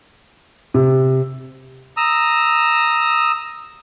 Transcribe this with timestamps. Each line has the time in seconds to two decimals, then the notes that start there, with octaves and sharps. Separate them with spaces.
0.74 C3
1.97 A#5 D#6 E6